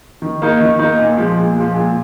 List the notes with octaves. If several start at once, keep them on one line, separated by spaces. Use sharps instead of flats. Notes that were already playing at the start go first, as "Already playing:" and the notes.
D#3
A#3 D#4
D#3
A#3 D#4
A#2
F3 G#3
A#2
F3 G#3
A#2